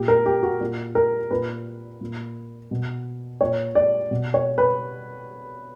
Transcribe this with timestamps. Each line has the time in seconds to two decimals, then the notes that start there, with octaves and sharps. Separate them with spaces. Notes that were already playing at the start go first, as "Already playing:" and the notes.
Already playing: A#2 G4
0.08 A#4
0.26 G4
0.43 F#4
0.61 A#2
0.95 A#4
1.31 A#2 B4
2.01 A#2
2.71 B2
3.41 A#2 C#5
3.75 D5
4.11 B2
4.34 C#5
4.58 B4